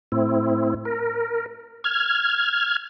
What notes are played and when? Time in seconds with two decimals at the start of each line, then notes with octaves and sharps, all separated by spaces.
0.12 A2 C4 E4
0.85 A#4
1.84 F6 G#6